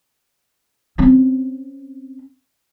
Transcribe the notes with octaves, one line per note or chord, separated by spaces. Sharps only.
C4 C#4